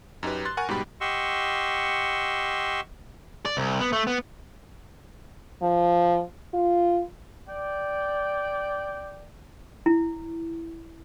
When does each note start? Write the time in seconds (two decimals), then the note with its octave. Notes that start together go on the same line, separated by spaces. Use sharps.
0.23 F#2 D#4 G4 B4
0.45 C6 F#6 A6
0.57 A#4 F#5 G#5 C#6
0.69 G#2 B2 G3 G4 B5
1.01 G4 D#5 F#5 C6 C#6 E6
3.45 D5
3.57 C2
3.80 B3
3.93 A3
4.07 B3
5.62 F3
6.54 F4
7.48 D5 G5
9.86 E4